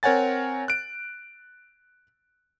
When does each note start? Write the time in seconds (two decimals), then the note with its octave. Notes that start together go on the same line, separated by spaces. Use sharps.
0.03 C4 A#4 C#5 F#5 G#5 A6
0.68 F#6 D7